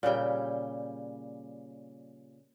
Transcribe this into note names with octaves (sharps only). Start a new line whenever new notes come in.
A#2 C#3 G3 G5